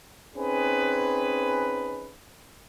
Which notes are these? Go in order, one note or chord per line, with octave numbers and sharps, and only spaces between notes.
C4 C#4 D#4 G#4 B4